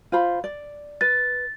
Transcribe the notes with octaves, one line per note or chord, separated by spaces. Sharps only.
F4 C5 B5
D5
B4 A6